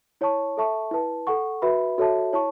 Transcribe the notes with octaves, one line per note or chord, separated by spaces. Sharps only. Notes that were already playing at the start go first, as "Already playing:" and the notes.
E4 C#5 A5 C#6
A4 E5 A5 C#6
E4 B4 A5
A4 F#5 C#6
F#4 B4 E5 B5
F#4 A4 C#5 E5 A5
E4 C#5 A5 C#6